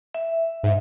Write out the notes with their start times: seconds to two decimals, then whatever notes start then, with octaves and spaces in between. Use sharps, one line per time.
0.15 E5
0.63 G#2